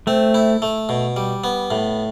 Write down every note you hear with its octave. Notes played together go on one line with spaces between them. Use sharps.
A3 C4
E4
A3
B2
G3
B3
A2